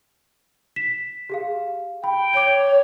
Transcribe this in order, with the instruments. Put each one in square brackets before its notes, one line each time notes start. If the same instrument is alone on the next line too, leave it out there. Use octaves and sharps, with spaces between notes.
[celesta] B6 E7
G4 G#4 F5
[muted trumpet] G5 [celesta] B5
[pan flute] C#5 [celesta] D6 G6